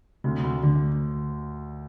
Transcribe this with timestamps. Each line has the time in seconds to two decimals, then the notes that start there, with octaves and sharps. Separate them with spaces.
0.24 D2 C3
0.44 D2
0.63 D2 D3